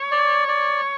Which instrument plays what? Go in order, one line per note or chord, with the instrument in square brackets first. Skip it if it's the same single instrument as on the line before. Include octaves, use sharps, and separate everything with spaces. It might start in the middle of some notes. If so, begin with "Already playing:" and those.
Already playing: [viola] C#5
[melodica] D5
D5